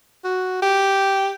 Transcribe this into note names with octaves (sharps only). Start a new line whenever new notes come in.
F#4
G4